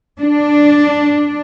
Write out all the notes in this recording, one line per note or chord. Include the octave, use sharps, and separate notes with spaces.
D4